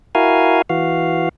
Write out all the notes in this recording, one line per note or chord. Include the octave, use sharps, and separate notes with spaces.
E4 F#4 A#4 F5 G#5
E3 F#4 F5